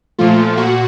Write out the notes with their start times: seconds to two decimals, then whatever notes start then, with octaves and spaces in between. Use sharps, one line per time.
0.18 A#2 F3 A3 F4
0.57 A#2 F#4